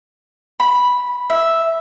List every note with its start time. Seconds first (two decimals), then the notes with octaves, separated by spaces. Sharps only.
0.60 B5
1.30 E5